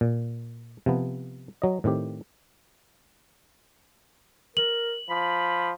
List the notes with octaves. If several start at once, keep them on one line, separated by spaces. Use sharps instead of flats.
A#2
C3 F3 B3
F#3 D#5
A2 D#3 C4 G4
A#4 F#7
F3 B5